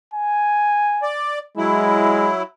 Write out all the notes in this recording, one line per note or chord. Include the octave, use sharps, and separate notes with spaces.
G#5
D5
F#3 G#3 E4